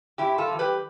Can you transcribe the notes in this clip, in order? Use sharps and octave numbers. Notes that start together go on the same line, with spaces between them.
G2 E4 G4
F4 A4
E3 G3
G4 B4